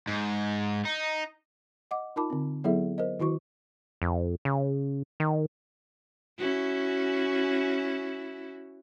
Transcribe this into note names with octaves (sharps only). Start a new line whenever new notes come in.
G#2
D#4
D#5 F#5 D6
D#4 F4 A#4 A5 B5 D6
D3 C4
F#3 B3 E4 G#4 A4 E5
A#4 C5 D#5
D#3 E4 F#4 C#6
F2
C#3
D#3
C#4 E4 F#4